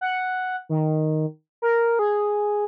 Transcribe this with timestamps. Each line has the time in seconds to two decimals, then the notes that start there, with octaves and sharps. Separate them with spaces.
0.01 F#5
0.69 D#3
1.62 A#4
1.99 G#4